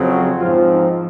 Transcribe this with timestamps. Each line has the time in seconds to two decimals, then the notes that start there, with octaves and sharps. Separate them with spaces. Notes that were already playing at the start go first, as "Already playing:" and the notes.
Already playing: F2 C#3 F#3 C4
0.11 F#4
0.40 G#2 F3 C4 F4
0.70 D#4